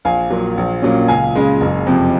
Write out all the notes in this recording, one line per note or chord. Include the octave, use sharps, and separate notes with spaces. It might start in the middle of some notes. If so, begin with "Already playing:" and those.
A#1 F5 G#5
A#2 F#3
A#1
A#2 F#3 A#3 C#4
C#2 F5 G#5
C#3 G#3
F#1
F2 C3